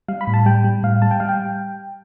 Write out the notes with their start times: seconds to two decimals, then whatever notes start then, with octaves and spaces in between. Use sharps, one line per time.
0.08 G3 F5
0.21 B5
0.27 A2
0.34 A5
0.46 G3 G5
0.64 G3
0.83 A2 F5
1.02 G3 A5
1.11 G5
1.20 G3 F5
1.29 G5